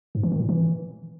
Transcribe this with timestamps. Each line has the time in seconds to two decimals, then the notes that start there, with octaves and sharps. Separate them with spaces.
0.15 G#2
0.23 E3
0.32 D#3
0.40 A2
0.49 E3